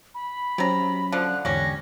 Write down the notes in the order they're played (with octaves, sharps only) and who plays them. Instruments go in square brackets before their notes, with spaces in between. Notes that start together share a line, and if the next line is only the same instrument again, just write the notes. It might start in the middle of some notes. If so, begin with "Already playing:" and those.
[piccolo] B5
[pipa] C3 A#5 [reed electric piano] F#3 C#4
[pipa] D3 F3 [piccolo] F#6
[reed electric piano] E2 G#2 D3 [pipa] G3 C#4 [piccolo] A#6